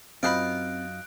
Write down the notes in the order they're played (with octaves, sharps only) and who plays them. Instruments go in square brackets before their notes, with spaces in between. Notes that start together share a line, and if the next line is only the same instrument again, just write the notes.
[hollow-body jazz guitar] F#2 G4 B5 [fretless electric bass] C4 [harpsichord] D#4 F4 [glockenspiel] F#6 D7